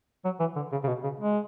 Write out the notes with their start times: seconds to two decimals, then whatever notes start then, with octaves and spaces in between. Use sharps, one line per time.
0.24 F#3
0.40 E3
0.55 D3
0.72 C#3
0.84 C#3
0.88 B2
1.03 C#3
1.20 G#3